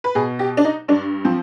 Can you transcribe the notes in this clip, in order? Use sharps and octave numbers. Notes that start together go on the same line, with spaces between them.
B4
B2 G#4
G4
D4
D#4
G2 D4
F3 C4